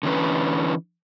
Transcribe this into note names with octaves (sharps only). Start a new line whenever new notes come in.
D3 E3 C#4 B4